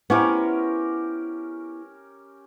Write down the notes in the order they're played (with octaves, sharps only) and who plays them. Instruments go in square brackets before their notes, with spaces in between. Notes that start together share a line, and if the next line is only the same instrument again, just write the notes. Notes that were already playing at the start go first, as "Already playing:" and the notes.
[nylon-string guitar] B3 E4 C5 [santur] C#4 G4 A#4